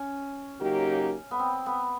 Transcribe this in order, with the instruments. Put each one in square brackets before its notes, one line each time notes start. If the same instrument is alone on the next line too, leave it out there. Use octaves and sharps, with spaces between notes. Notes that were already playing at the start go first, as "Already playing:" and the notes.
Already playing: [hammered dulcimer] C#4
[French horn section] C#3 F#3 A#3 D#4 G4
[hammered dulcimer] B3
C4
B3